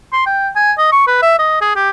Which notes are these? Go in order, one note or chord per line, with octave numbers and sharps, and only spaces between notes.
C6
G5
G#5
D#5
C#6
B4
E5
D#5
G#4
G4